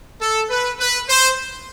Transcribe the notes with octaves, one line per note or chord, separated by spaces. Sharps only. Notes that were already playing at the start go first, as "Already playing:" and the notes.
A4
B4
B4
C5